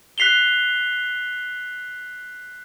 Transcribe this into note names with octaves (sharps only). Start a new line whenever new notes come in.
F#6 B6 C7 F7 G7